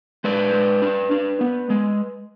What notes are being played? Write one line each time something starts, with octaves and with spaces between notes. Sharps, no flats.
G#3 B4 D5
G#3
D4
D4
B3
G#3